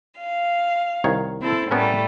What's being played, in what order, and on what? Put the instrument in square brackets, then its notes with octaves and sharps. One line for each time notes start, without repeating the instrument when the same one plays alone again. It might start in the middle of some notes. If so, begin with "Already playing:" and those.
[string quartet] F5
[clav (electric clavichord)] C2 D#3 C#5
[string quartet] C4 E4 A4
[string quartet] A2 G3 A3 [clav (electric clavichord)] B3 C#4 A#4